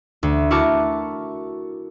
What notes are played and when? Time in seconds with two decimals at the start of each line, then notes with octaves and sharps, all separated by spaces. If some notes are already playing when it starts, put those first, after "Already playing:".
0.23 D2
0.51 E4 F#4 A#4 A5 C#6 D6